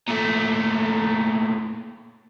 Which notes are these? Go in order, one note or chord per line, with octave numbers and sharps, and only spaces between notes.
A#2 A3